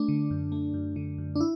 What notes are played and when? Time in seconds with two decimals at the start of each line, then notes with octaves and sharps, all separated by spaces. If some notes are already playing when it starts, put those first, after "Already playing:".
Already playing: A3 D4
0.08 D3
0.31 F#2
0.52 A3
0.74 F#2
0.96 D3
1.18 F#2
1.35 D4
1.41 E4